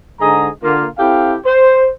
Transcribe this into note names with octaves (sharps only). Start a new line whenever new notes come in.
G#2 D3 G#4 D#5 A#5
D3 A#3 F4
C4 E4 G4 A4 F5 G5
C5